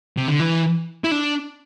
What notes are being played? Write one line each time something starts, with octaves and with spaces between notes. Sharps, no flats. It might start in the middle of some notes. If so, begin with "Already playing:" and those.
C3
D3
E3
E4
D4